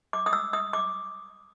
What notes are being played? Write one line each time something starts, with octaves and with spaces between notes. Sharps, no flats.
D6
D#6
E6
D#6
D6